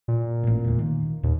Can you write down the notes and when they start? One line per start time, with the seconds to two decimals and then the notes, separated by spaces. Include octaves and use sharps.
0.08 A#2
0.44 A1 A2
0.64 E1 D2
0.79 D#3
1.23 D#2 A#2